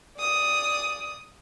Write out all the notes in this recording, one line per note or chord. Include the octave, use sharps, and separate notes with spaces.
D5 D#6